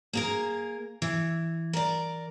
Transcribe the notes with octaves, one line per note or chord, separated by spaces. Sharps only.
A#3 G#4 A#4
E3
A#4 D5